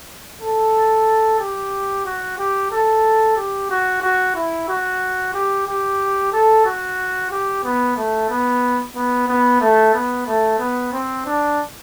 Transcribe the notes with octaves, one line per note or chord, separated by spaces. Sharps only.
A4
G4
F#4
G4
A4
G4
F#4
F#4
E4
F#4
G4
G4
A4
F#4
G4
B3
A3
B3
B3
B3
A3
B3
A3
B3
C4
D4